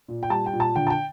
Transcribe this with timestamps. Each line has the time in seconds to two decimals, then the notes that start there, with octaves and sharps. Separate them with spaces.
0.08 A#2
0.23 G5
0.30 G3 A5
0.46 G5
0.53 A#2
0.60 A5
0.76 D3 G5
0.87 A5
0.90 G5